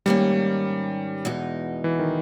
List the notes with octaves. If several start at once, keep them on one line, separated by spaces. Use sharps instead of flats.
G#2 D#3 G3 A#3 C#4
E2 B2 G#3 D#4
E3
D#3